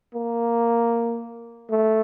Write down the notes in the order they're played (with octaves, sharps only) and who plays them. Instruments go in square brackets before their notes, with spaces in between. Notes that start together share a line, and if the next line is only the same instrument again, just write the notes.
[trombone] A#3
A3